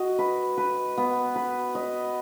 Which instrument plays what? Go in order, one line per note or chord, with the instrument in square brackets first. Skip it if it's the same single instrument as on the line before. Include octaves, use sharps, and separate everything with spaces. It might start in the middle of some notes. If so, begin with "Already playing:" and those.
Already playing: [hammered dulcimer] F#4 D#5
B4
B4
B3
B4
D#5